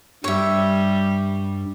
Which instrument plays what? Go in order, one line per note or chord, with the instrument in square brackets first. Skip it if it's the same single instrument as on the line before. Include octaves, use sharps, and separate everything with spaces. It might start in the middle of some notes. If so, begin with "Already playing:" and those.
[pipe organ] G2 [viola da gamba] G3 [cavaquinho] C#5 E5